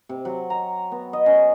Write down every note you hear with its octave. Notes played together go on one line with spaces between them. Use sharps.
C3
F#3
A#5
B3
D#5
C#4